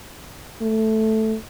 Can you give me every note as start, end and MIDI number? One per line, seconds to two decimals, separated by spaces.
0.61 1.36 57